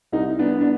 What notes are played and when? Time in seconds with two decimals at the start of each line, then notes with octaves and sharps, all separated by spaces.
0.12 C2 D#4
0.39 B3 D4
0.61 D4